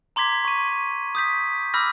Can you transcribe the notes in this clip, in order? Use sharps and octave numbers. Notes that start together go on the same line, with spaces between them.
A#5 C6 D6 G#6 B6
C#6 D#7
D#6 G6 B6
B5 D6 E6 F6 G6 A#6